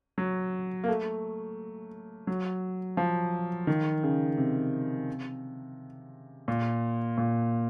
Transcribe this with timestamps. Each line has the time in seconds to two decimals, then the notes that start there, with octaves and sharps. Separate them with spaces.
0.18 F#3
0.84 A#3
0.88 A3
2.27 F#3
2.97 F3
3.67 D#3
4.03 C#3
4.38 C3
6.48 A#2
7.17 A#2